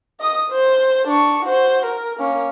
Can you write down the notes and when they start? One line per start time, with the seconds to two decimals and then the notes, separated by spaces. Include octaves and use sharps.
0.20 D#5 D#6
0.50 C5
1.07 D4 C#6
1.45 F#4 C5
1.85 A#4
2.19 A#3 C#4